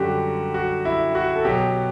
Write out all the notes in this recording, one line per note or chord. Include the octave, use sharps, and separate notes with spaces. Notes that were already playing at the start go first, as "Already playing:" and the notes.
Already playing: F#2 D3 G3 F#4 G4
F#4
E4
F#4
A4
B2 F#3 G4